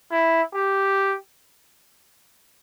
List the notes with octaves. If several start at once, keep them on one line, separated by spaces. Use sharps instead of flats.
E4
G4